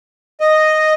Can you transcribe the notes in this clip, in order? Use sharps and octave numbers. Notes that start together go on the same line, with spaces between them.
D#5